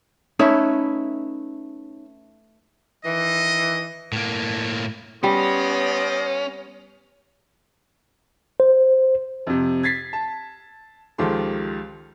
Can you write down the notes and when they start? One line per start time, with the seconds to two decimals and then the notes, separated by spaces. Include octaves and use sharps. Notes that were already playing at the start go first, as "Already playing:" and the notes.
0.39 A3 C#4 D#4 E4 B4 C#5
3.04 D#3 E3 D#5
4.13 A2 A#3
5.23 G3 B3 C#4 C5 D5 D#5
8.60 C5
9.47 F2 C3
9.83 G#6 A6 B6 C7
10.13 A5
11.18 C#2 D#3 F3 G4 A4 C6